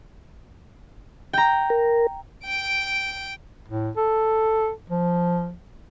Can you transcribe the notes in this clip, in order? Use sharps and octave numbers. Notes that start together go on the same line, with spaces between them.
G5 A#5
A#4
G5 D7
A2
A4
F3